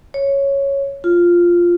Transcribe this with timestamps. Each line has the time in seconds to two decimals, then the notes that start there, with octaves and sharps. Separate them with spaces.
0.14 C#5
1.04 F4